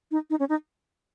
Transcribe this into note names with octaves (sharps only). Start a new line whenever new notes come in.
D#4
D#4
C#4
D#4